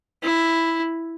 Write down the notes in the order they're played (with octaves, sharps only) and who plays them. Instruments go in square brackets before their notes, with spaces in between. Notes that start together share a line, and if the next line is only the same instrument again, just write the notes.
[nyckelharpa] E4